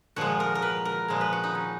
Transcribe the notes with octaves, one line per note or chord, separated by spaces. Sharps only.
A#2 F3 G#3 F#4
A#4
A#4
B4
A#4
A#2 F3 G#3
B4
F#4
D#4
C#4